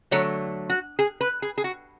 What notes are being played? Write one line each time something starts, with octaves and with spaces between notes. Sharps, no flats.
D3 F#3 A3 C#5
F#4
G#4
B4
G#4
G#4
F#4